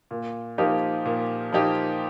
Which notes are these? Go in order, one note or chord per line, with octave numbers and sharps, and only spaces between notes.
A#2
F3 A#3 D#4 G4
A#2
F3 A#3 D#4 G4